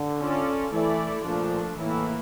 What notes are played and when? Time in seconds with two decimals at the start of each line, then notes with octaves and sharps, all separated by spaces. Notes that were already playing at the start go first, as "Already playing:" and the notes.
Already playing: D3
0.20 C#4 F4 A4 D5
0.73 E3 A3 E4 A4 D5
1.25 A#2 F3 A3 D4
1.78 A2 E3 A#3 E4